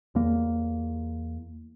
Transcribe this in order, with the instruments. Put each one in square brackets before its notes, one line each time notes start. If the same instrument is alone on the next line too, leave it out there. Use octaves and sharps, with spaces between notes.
[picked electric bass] E2 A#3